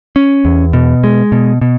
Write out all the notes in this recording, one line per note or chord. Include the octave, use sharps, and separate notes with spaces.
C#4
E2
B2
G#3
B2
B2